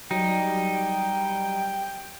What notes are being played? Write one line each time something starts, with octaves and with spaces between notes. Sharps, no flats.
F#3 G3 D#4 G5